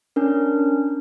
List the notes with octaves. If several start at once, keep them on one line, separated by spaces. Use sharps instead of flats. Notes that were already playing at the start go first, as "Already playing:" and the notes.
C#4 D4 A#4